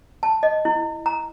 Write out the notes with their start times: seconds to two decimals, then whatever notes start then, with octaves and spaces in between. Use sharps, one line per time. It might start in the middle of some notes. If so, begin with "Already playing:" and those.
0.23 A5
0.43 D#5
0.65 E4
1.06 A#5